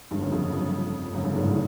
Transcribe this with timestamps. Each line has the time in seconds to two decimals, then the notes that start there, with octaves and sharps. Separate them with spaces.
0.11 G1 G2
0.21 F#1 F#2
0.32 F2
1.13 F#1 F#2
1.24 G1 G2
1.34 G#1 G#2
1.44 A2